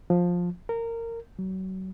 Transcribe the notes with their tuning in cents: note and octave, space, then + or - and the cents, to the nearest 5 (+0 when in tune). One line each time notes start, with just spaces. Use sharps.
F3 +15
A#4 -20
F#3 +30